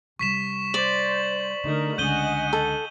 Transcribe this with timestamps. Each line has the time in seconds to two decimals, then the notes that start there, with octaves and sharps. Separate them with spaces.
0.19 C3 G3 C#6 B6 E7
0.74 C5 D5 F#7
1.64 D3 A3 D#4 A#4
1.98 C#2 D3 D#5 F#5 G#5 G6 D#7 G7
2.53 A4